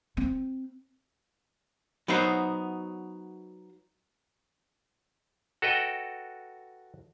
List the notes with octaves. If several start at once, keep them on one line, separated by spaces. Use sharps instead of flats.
C4
F#3 B3 D#4 C5
F#4 A4 B4 D#5 G5